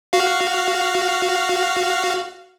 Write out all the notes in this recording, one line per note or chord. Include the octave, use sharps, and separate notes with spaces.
F#4 F5